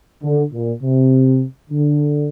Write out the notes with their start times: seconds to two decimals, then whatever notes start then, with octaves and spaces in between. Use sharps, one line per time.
0.22 D3
0.51 A#2
0.81 C3
1.70 D3